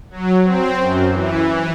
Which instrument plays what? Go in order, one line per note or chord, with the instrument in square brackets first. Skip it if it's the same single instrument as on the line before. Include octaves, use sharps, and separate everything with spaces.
[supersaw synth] F#3
C4
F#2
E3